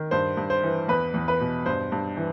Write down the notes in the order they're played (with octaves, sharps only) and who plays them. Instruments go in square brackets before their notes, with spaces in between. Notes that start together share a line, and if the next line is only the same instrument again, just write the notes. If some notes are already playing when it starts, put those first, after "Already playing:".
Already playing: [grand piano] D#3
G2 C5
G2
C5
E3
E2 B4
E2
B4
B2
G2 C5
G2
E3